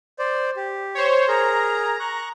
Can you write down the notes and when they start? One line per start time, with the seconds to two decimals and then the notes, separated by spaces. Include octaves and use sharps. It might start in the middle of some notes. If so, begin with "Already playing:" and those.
0.19 C5 D5
0.56 G4
0.95 C5 C#5
1.28 G#4 A#4 A#5
2.00 C#6 F#6